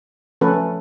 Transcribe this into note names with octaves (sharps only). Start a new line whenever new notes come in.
F3 A3 C#4 A4 B4